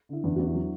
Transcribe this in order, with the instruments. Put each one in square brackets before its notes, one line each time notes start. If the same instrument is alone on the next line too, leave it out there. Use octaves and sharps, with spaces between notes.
[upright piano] D3 [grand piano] E4
[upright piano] E2 [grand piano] D4
[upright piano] E2 [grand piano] F#4
[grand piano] E4
[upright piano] F#3